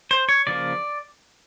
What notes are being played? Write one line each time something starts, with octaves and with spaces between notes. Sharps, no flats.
C5
C#5
C#3 F3 A#3 D5